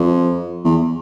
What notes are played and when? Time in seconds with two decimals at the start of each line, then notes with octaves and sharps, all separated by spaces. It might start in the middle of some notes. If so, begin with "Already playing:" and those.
Already playing: F2
0.65 E2